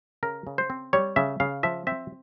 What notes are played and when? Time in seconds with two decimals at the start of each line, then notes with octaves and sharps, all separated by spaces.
0.23 C#3 A#4
0.47 C#3
0.58 C5
0.70 C4
0.93 G3 C#5
1.16 C#3 E5
1.40 C#3 F5
1.63 F3 E5
1.87 C4 E5